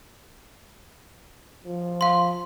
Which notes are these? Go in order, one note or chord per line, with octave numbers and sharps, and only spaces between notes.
F3
F5 C6